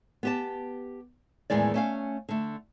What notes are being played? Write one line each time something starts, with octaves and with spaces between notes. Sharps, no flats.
B3 G4 A5
E2 A2 D#3 G#3 D5
A3 C#4 F5
D3 A3